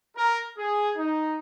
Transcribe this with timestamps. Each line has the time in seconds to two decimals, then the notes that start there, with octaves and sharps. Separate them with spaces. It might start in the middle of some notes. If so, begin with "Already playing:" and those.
0.16 A#4
0.58 G#4
0.97 D#4